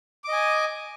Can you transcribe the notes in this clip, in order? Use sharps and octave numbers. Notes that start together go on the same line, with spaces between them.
D#5 G#5 D6